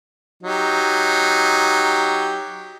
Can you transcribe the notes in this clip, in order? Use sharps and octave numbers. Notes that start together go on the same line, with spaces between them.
F#3 D#4 G4